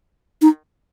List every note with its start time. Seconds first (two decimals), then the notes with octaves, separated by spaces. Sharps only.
0.42 D#4